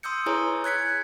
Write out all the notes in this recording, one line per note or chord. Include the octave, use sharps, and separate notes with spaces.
C6 D#6 E6 G6 C#7
E4 G#4 B4 C#5 G#5 A#5
F#6 G#6 B6 C#7